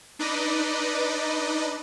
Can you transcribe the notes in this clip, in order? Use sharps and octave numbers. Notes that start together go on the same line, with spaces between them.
D4 D#4 B4 D5 D#5